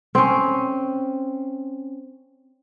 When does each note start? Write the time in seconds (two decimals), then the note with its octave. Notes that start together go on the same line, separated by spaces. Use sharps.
0.15 C4 C#4